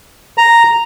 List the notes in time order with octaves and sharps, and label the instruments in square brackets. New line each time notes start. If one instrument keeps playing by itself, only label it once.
[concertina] A#5